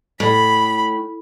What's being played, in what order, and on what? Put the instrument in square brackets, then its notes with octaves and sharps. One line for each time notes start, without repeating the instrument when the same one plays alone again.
[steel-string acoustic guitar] A2 [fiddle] B5